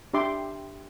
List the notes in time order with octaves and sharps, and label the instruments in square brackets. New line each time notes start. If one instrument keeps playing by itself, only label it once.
[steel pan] D4 G4 E5 C6 D6